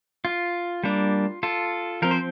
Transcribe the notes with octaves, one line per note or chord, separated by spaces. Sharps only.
F4
G3 A#3 D4
F4 A4
F3 C4 A#4
C5